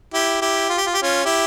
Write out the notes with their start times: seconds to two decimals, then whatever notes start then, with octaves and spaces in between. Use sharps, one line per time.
0.14 E4 G4
0.42 E4 G4
0.70 F4
0.77 G4
0.86 F4
0.94 G4
1.02 C#4 F4
1.25 E4 G4